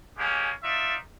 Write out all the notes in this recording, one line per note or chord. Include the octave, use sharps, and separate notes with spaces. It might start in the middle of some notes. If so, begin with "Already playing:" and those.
G#3 A#3 C#4 G4
D#4 F4 D5 E5